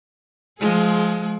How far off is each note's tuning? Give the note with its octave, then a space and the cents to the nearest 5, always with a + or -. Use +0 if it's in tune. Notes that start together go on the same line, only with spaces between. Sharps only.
F3 +0 G#3 +20 G#4 +40